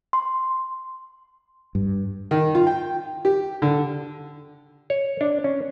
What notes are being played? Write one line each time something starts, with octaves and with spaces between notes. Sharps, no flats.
C6
G2
D#3
F4
G5
G4
D3
C#5
D4
C#4